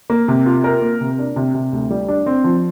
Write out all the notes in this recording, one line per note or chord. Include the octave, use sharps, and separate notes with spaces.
A#3
C3
F4
A#4
A#3
C3
D4
C3
C3
D2
G3
D4
C4
F3